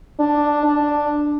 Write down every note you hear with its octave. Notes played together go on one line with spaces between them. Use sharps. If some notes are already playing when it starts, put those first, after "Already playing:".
D4
D4